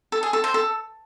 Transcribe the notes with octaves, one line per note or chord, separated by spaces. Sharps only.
A4
G#4
A4
C5
A4